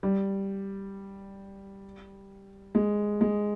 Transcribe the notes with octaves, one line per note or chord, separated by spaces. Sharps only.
G3
G#3
G#3